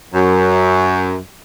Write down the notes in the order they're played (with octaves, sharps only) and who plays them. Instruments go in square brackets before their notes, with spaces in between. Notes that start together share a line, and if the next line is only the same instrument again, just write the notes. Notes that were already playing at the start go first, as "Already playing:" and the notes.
[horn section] F#2